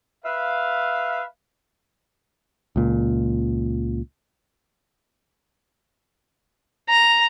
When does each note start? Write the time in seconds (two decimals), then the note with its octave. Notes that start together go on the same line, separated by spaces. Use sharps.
0.25 B4 E5 F5
2.76 C#2 A#2
6.90 A#5